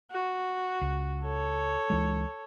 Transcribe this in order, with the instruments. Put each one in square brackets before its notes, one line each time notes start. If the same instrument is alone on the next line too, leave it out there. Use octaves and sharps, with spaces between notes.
[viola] F#4
[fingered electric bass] C#2
[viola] A4 C#5
[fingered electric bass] C#2 E3 G#3